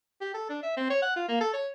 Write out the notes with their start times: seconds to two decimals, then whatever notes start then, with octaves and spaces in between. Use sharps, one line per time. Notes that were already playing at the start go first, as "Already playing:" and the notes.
0.21 G4
0.34 A4
0.49 D4
0.63 E5
0.77 C4
0.90 C#5
1.02 F#5
1.16 F4
1.29 A#3
1.41 A4
1.53 C#5